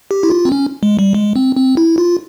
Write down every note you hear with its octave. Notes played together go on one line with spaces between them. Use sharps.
G4
E4
F4
C4
C#4
G#3
G3
G#3
C4
C4
E4
F4